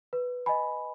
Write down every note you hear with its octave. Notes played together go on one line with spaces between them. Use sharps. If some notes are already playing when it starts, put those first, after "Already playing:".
B4
D#5 G#5 B5